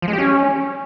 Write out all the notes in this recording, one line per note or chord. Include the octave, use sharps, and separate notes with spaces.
F3
G#3
G4
C#4